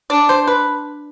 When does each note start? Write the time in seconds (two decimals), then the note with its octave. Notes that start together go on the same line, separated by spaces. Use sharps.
0.10 D4 D5
0.29 C5
0.47 B4